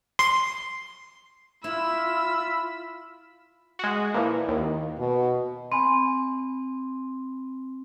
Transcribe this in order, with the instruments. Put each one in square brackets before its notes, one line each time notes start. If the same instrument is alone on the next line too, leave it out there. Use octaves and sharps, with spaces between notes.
[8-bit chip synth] C6
[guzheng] E4 [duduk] F4 [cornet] B5 [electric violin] E6
[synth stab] G#3 F#4
[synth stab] A#2 E3 F3 [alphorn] E4
[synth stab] D#2 [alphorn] D#3
[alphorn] B2
[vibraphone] C4 [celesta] G#5 B5 C6